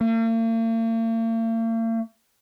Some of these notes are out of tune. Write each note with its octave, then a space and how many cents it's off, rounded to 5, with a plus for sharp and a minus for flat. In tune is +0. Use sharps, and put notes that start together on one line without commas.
A#3 -45